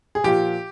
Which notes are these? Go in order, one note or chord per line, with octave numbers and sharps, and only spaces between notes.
G#4
A#2 F3 G4